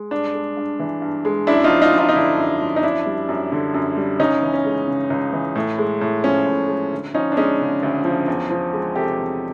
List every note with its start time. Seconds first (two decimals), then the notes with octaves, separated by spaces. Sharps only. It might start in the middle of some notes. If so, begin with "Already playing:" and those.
Already playing: G#3
0.11 G2 D4
0.34 G#3
0.57 G2
0.79 E3
1.02 G2
1.25 G#3
1.47 F#2 D4 E4
1.64 D#4 F4
1.70 F3
1.82 D#4 F4
1.93 F#2
1.98 D#4 F4
2.09 D#4
2.15 D3 D4 E4
2.38 F#2
2.61 F3
2.76 D#4
2.83 F#2 D4 E4
3.06 G3
3.29 F#2
3.52 D3
3.74 F#2
3.97 G3
4.20 C#2 C#4 D#4
4.42 E3
4.53 C#4
4.65 G#3
4.88 C#3
5.10 C#2
5.33 E3
5.55 A2
5.78 G#3
6.01 A2
6.24 F3 C#4
6.46 A2
6.68 G#3
6.92 D2
7.14 F3 C#4 D#4
7.32 D4
7.37 G#3 C#4 D#4
7.59 C#3
7.83 D2
8.05 F3
8.28 E2
8.50 F3
8.73 G#3
8.95 C3 G4 A4
9.19 E2